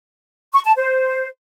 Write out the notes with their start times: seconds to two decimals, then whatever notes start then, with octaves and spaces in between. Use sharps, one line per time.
0.53 C#6
0.65 A5
0.76 C5